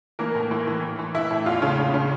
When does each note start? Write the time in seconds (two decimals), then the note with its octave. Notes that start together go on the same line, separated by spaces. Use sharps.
0.19 E3 A#3 A#4
0.35 A2
0.51 E3
0.67 E3
0.82 E3
0.99 E3
1.15 E3 E4 E5
1.31 A2
1.46 E2 F4 F5
1.62 C#3
1.78 C#3
1.94 C#3